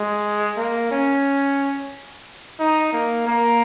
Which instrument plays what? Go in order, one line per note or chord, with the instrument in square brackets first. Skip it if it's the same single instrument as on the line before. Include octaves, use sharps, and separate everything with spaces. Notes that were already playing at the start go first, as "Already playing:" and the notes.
Already playing: [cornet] G#3
A#3
C#4
D#4
A#3
A#3